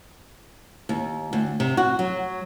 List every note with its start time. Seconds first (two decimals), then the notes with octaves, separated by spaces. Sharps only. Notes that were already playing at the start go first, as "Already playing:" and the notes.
0.89 D#2
1.33 D2
1.60 C3
1.77 F#4
1.99 F#3